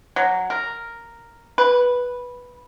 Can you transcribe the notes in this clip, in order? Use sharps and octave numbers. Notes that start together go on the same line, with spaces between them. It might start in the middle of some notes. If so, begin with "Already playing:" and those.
F#3
A#4
B4